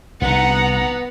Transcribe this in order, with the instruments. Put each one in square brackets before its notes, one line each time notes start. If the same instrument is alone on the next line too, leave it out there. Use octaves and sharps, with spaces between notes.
[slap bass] C2 [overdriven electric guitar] B3 [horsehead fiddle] F#5 A#5